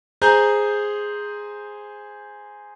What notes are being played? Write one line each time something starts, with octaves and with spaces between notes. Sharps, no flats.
G#4 C5 G#5 A#5 G6